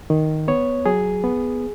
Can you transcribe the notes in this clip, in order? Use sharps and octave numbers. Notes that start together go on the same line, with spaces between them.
D#3
B3 C#5
F#3 G#4
B3